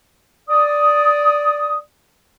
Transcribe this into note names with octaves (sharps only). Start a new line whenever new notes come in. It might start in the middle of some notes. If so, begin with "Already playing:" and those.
D5 D#6